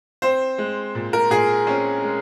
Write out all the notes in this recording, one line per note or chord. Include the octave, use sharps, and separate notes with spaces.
C4 C5
G#3
A#2
A#4
A#2 G#4
C4 C#4
G#3